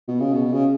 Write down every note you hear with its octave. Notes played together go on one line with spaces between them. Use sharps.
B2
C#3
B2
C#3